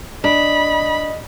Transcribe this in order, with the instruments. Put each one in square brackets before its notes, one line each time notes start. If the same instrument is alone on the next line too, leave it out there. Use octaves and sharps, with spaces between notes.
[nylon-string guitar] D4 [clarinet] D#5 [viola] B5